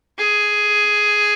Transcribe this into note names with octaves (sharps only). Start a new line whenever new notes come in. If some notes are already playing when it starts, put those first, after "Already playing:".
G#4